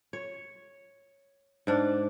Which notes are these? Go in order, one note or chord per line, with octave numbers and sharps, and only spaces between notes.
C#5
G#2 D4